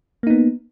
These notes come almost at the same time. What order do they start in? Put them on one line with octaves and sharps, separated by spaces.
A#3 D#4 B3